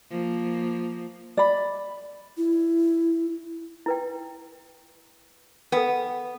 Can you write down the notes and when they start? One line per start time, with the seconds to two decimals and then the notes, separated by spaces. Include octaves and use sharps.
0.11 F3 A#3
1.37 D5 B5
2.37 E4
3.86 E4 B4 G5
5.72 B3 A4 B4 G5